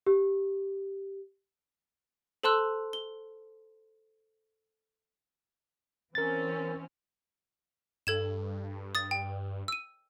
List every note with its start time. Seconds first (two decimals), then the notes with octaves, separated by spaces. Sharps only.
0.06 G4
2.43 A4 C5 A5 C6 E6 F#6
2.93 G7
6.15 E3 C4 C#4 A#4 A6
8.07 G2 A4 G#6 E7
8.95 D#6 A6
9.11 G5
9.68 E6 D#7